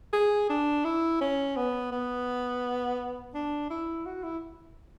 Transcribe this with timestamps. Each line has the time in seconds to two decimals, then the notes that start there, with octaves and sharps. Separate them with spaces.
0.13 G#4
0.50 D4
0.85 E4
1.21 C#4
1.56 B3
1.92 B3
3.34 D4
3.70 E4
4.06 F#4
4.23 E4